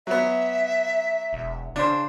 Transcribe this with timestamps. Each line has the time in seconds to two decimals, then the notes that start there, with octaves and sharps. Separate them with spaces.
0.07 F#3 B3 E5
1.33 E1
1.76 C#3 D4 C5